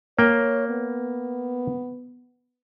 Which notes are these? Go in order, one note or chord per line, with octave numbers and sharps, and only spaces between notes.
A#3 C#5 G5
B3